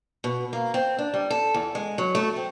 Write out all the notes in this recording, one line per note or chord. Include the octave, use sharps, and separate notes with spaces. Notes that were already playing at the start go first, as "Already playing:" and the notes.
B2
A#3
C4
D4
G3
A4
E2
G#3
F#3
A3
C4